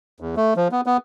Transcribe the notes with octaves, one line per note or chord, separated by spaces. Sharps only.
E2
A3
F3
B3
B3